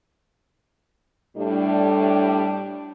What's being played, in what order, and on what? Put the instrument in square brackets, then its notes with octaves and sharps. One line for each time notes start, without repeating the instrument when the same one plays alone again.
[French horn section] A2 G3 D4